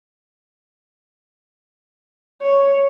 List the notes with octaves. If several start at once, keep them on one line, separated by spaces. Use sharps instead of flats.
C#5